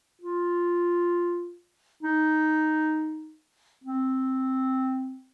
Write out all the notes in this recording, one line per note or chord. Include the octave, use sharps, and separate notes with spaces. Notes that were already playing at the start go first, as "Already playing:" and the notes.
F4
D#4
C4